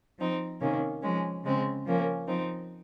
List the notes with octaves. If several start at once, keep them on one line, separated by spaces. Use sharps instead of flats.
F3 C4 D#4
C3 D#3 A#3 C#4
F3 G#3 C#4
C#3 G#3 C4
F3 A#3 C#4
F3 C4 D#4